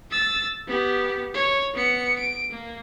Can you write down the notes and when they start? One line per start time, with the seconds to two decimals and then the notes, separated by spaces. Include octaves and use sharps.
0.11 E6 A6
0.67 B3 G4
1.34 C#5
1.74 B3 C#7
2.18 D7
2.51 A#3